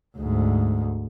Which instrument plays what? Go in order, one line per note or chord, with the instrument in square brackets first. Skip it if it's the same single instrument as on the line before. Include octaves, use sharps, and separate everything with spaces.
[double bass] D2 G#2